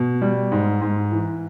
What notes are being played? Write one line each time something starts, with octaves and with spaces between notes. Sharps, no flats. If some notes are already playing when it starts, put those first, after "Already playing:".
Already playing: B2
G3
G#2
G#2
E3